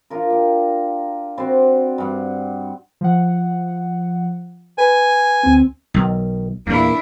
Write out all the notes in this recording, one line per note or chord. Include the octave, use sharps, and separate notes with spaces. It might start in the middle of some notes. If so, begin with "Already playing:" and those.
D4 F4 A#4
G4
C4 F#4 C5 D5
G2 F#5
F3 F#5
B4 G#5
D2 C4
B1 D#3
E2 A#2 A#3 D4 E4